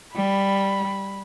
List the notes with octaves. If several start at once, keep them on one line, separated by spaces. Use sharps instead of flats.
G3 B5